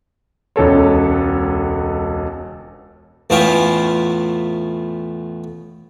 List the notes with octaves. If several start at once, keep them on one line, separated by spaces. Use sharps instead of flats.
E1 C#2 A4 C#5
E2 A2 C#4 E4 F4 G5